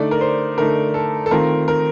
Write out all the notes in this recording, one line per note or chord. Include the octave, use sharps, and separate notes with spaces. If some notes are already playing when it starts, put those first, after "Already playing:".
Already playing: D3 A3 D#4 D5
A#4
C5
D3 A3 D#4 A#4
A4
A4
D#3 A3 C4 F4 A#4
A#4